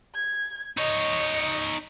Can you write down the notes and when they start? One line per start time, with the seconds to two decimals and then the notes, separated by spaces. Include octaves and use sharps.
0.15 G#6
0.77 D#4 C#5 D#5